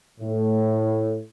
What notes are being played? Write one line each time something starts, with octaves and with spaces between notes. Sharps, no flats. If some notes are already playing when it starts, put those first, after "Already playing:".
A2